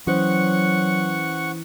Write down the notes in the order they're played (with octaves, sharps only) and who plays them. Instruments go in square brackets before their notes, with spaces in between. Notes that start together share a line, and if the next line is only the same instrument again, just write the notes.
[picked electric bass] E3 [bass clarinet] F#3 [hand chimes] C#4 C5 [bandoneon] F#5 C#6